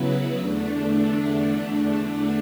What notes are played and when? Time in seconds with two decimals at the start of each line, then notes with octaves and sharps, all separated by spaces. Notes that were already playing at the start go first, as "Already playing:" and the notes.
Already playing: C#3 F#3 B3 E4 B4
0.37 E2 D3 A3 D4